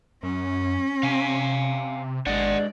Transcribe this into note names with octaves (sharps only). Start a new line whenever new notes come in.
F#2 C#4
C3 F5 G#5
G#1 G#3 D4 G#4 D5 F#5